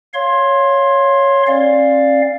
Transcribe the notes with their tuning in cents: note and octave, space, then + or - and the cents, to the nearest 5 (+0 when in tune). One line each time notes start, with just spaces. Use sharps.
C#5 +0 F5 +0 C6 +20
C#4 -45 D5 +0 F5 +0